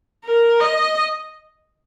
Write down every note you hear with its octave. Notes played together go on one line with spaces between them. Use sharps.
A#4
D#5